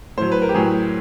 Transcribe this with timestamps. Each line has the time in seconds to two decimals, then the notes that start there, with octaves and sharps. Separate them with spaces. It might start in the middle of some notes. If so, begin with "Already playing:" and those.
0.17 A2 F#3 C5
0.32 B4
0.42 A#4
0.49 G4
0.54 A2 F#3 G#4